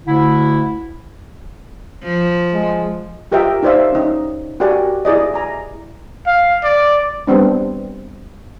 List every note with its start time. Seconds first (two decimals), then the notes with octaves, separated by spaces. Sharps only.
0.06 D2 D3 E4
2.03 F3
2.53 G#3
3.32 F4 G4 A#4 D#5 E5 G5
3.63 D#4 A#4 C5 D5 E5 F5
3.92 C#4 D#4
4.60 F#4 G4 A#4 D5 F#5 G#5
5.05 E4 G#4 D5 D#5
5.34 G#5 A#5
6.27 F5
6.63 D5
7.27 G3 B3 C4 D4